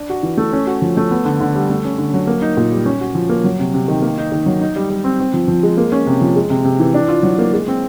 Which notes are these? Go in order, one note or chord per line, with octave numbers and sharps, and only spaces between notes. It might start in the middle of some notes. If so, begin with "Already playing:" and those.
Already playing: D4
F#4
E3
A3
C#4
F#4
F3
A3
B3
D3
D3
G3
A3
C#4
D3
F#3
A#3
D#4
A#2
G3
C#4
F#4
F3
A#3
F#3
C3
C3
D#3
A#3
D#4
D#3
F#3
D#4
G3
G3
C4
C4
F3
F3
G#3
A#3
C#4
C3
F3
G#3
C3
C3
E3
D4
F4
F#3
A#3
G#3
C4